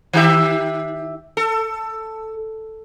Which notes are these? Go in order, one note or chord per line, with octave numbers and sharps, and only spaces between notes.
D#3 G4 E5
A4